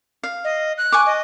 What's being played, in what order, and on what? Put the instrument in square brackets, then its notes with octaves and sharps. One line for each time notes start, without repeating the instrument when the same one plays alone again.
[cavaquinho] F5
[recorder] D#5
F#6
[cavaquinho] G#5 C#6 D6
[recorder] D#5